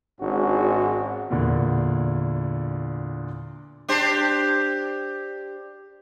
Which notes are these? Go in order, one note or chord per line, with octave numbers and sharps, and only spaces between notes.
G#1 G#2 C#4 D4 F#4
E2 A#2 D3
D4 G4 C5